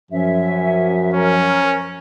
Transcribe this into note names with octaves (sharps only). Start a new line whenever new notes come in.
F#2 F3 C#4 E5
C#4 A#4